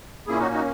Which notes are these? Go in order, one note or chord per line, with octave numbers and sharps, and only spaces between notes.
A#2 A#3 C#4 E4 G#4
D#4 F#4
D#4 F#4